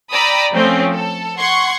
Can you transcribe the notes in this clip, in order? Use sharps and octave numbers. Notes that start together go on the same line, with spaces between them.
D5 G5 A#5 B5 D#6 E6
F3 A3 C4 C#4
A4
F#5 C6 C#6 G#6